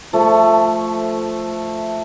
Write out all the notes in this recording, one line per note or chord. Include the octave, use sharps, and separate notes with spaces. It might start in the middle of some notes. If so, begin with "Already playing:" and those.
F3 A3